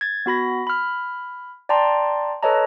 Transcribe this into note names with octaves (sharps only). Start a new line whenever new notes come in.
G#6 A6
B3 F#4 B5 A#6
B5 F6
D5 G5 A5 A#5 C6
A4 B4 C#5 D#5 A5 A#5